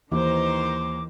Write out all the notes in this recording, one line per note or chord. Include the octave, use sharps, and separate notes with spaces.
D#2 D#3 E3 C5 A#5 D6